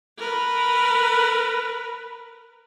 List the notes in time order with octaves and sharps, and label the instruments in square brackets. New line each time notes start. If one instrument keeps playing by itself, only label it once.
[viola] A#4 B4